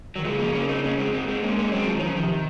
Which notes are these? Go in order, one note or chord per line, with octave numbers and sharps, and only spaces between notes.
D#3 F#3
C#3 F3 G#3
F#3 A#3
A#3 C#4
C4 D#4
A#3 C#4
G#3 C4
G#3 C4
G#3 C4
G#3 A#3 C#4
A#3 C#4
F#3 G#3 C4
F3
D#3
F3
C#3
D#3
C3